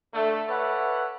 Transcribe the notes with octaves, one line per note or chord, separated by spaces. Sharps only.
D3 A3
A4 B4 C#5 D5 E5 F#5